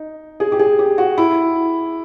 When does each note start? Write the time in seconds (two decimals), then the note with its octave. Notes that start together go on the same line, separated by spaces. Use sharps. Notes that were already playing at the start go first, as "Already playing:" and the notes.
Already playing: D#4
0.40 G#4
0.52 G4
0.59 G#4
0.79 G4
0.98 F#4
1.18 E4